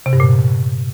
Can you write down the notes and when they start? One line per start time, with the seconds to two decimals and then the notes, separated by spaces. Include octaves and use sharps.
0.06 C3
0.13 G2
0.20 A#2